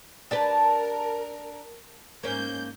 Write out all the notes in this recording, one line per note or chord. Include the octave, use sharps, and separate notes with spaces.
D4 G4 A#4 B4 A5
G#2 A#3 C#4 G6